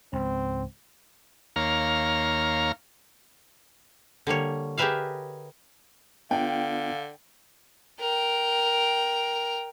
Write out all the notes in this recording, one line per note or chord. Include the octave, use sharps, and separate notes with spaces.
C#2 G#2 C4
D#2 A#3 C#5 F5 A#5 F6
D3 G3 A#3 C#5
G4 G#4 A#4 B4 E5 F5
D3 B3 D4 F4 F5 G5
A#4 G5